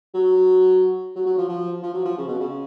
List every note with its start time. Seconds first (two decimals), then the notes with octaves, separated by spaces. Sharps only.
0.14 F#3
1.16 F#3
1.26 F#3
1.38 F3
1.49 F3
1.83 F3
1.94 F#3
2.05 F3
2.18 C#3
2.28 B2
2.40 C#3